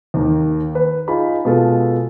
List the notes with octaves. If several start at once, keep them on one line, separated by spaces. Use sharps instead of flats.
D#2 D#3
B4
D#4 F4 G#4 B5
B2 G#3 F4 A4